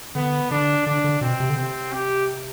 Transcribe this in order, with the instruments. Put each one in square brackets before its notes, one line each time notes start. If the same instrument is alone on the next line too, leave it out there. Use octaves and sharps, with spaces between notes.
[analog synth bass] D3 [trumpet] B3
[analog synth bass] D3 [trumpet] D4
[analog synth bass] D3 [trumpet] D4
[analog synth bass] D3
[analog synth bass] B2 [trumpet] C4
[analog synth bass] C3
D3
[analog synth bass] C3 [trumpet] C4
[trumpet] G4